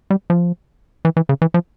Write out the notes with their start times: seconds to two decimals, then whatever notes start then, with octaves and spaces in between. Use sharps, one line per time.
0.10 G3
0.30 F3
1.05 E3
1.17 E3
1.29 C#3
1.42 E3
1.54 F3